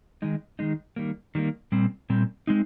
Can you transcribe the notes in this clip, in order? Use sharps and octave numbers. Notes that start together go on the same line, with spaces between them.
D#3 G#3 D#4
D#3 G#3 D#4
D#3 G3 A#3
D#3 G3 A#3
A#2 G3 C4
A#2 G3 C4
G#3 C4 D#4